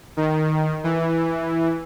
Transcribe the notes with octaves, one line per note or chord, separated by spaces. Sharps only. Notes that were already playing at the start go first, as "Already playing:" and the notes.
D#3
E3